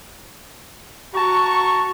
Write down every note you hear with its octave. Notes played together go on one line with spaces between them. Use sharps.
F#4 A5 A#5 C#6